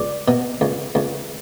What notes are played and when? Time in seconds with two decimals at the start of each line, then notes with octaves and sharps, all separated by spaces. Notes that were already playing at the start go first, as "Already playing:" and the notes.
Already playing: C#2 D5
0.28 B2
0.61 C#2
0.95 C#2